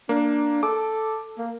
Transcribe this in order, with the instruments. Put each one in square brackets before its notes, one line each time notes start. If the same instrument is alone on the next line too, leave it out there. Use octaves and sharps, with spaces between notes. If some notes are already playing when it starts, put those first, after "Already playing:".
[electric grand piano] A#3 [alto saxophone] D4
[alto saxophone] A4 [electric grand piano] D6
[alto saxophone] A#3